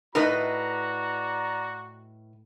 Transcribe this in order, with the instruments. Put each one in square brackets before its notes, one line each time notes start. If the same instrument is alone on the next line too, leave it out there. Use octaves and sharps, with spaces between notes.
[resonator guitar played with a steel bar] A2 B4 D#5 [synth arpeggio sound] D#4 A#4 [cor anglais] F#4 [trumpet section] D5 A#5